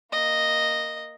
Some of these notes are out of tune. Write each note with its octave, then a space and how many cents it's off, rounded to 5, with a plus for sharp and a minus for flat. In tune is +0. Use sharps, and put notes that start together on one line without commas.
A#3 +0 D#5 -5